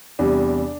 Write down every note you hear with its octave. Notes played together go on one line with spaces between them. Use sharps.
E2 C3 G3 D4